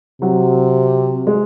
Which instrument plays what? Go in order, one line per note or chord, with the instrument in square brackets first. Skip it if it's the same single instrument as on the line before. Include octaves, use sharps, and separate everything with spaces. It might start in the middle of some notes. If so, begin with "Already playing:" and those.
[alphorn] C3 [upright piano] F#3
[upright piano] G#3